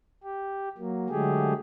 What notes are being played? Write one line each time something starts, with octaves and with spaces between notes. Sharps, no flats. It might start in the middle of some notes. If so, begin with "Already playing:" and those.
G4
F#3 A#3
D3 F#3 G#3 A3 G4 G#4